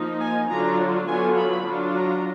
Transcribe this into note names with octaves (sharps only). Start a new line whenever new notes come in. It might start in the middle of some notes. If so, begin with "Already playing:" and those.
Already playing: F3 A#3 D#4
G#5
D3 F#3 D4 F4 A#5
D3 F#3 B3 F4 G#5
B5
F#3 D4 F4
A#5